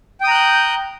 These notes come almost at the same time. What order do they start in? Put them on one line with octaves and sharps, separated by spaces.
G5 D#6 A#5 F#6 G6